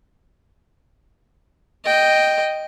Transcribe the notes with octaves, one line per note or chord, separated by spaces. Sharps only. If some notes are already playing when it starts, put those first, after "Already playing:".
D#5 G5